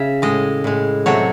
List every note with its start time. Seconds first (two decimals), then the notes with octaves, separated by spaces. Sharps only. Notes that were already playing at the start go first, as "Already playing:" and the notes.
Already playing: C#3 E5
0.22 A2 G#3 D#5
0.64 A2 G#3
1.06 C3 F#3 A3 C#5